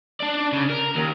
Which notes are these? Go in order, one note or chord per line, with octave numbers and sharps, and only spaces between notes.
D4 D5
C#3
A#4
D#2